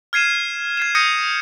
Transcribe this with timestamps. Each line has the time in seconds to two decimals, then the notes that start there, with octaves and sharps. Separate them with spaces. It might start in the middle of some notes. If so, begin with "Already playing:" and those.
0.13 F6 G#6 C7 D#7 E7
0.77 G#6 C7 E7
0.95 D#6 G6 A#6 C#7 D#7